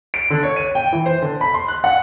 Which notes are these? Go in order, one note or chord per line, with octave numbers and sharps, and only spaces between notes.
D7
D3
C#5
D#7
G5
E3
C5
D3
B5
C6
F#6
F#5